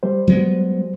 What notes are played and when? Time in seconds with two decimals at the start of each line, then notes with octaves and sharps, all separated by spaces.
0.03 G3 C5
0.27 F#3 G#3 B3